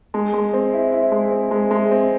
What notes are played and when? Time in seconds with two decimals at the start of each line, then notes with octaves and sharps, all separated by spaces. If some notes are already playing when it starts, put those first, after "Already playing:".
0.14 G#3
0.34 G#3
0.54 C4
0.73 E4
0.92 E4
1.12 G#3
1.31 C4
1.51 G#3
1.71 G#3
1.91 C4